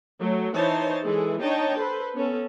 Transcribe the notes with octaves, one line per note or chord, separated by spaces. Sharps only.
F#3 A3
E3 D#4 C5 C#5 A5
E3 G#3 E4 G#4 A4
D4 D#4 C#5 D#5 G5 A5
A4 B4 C5
B3 C#4 A4